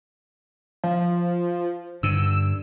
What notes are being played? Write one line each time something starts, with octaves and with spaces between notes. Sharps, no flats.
F3
G2 D3 E6